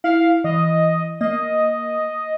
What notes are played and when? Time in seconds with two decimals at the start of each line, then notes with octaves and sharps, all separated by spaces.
0.04 E4 F5
0.44 E3 D#5
1.21 A#3 D#5